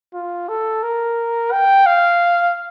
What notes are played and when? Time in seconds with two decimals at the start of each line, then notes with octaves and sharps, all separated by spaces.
0.14 F4
0.48 A4
0.83 A#4
1.52 G5
1.86 F5